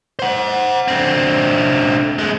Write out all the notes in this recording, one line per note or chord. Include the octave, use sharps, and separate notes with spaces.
C5 F#5
D3 C4
G#3 A3